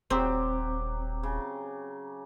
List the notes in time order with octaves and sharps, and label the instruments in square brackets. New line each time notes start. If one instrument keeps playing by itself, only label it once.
[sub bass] D#1 [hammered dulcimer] F#3 G4 [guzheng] C4
[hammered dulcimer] C#3